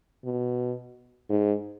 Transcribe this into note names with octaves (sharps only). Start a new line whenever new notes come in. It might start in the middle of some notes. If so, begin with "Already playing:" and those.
B2
G#2